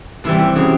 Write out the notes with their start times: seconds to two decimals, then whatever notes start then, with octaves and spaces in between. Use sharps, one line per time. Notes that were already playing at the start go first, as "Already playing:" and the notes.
0.24 C3 E3 G3 E4
0.40 E4
0.55 C#3 F#3 E4